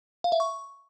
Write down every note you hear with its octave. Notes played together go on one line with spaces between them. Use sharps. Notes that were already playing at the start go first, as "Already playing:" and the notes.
F5
E5
C#6